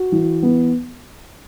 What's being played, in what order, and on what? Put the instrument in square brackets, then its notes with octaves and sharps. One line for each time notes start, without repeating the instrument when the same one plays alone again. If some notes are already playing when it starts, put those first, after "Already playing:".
Already playing: [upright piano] F#4
E3
B3